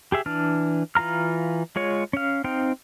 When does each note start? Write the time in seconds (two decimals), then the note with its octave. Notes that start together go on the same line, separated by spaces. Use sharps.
0.12 G4 G#4 E5
0.26 E3 D4 F6
0.95 E3 F4 F5 A#5 F6
1.76 G#3 F4 C#5
2.13 C#4 F5
2.44 C4 D#4 F5 G5